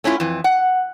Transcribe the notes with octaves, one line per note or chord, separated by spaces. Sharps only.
A3 C#4 D4 E4 F4
F2 E3
F#5